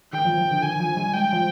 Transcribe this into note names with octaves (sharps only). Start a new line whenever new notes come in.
D#3 G5
F3
F3
D3
D#3 G#5
F3
G3
G#3 G5
F3